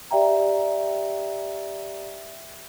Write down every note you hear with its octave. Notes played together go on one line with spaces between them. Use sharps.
G4 D5 E5 G5 A#5